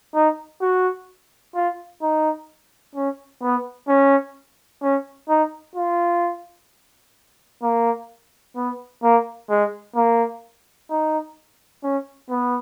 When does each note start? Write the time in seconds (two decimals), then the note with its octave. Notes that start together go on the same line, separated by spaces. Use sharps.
0.15 D#4
0.61 F#4
1.55 F4
2.02 D#4
2.95 C#4
3.42 B3
3.88 C#4
4.83 C#4
5.29 D#4
5.76 F4
7.63 A#3
8.56 B3
9.03 A#3
9.50 G#3
9.96 A#3
10.90 D#4
11.83 C#4
12.30 B3